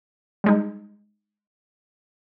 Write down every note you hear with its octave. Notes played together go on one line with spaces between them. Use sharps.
G3 G#3 D#4